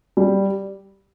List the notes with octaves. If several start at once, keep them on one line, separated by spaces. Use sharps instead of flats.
G3